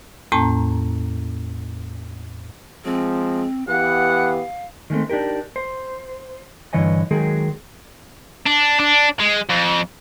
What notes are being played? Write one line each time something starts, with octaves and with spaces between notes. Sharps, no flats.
E2 A2 A#3 C#4 A5 A#5
F3 G#3 C4
E3 B3 G4 F5 F#5
D#3 G#3 A3 C4
D4 D#4 G4 A#4
C5
G2 D3 E3 C#5 D#5 G#5
D#3 F#3 G#3 G#4 A#4
D4
D4
G#3
F2